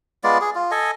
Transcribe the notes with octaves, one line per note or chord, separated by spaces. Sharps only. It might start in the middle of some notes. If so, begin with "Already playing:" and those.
G#3 B3 F4 D5
G#4
F4
A4 D#5 G#5